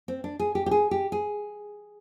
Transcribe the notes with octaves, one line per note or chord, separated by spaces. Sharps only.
C4
D4
G#4
G4
G4
G#4
G4
G#4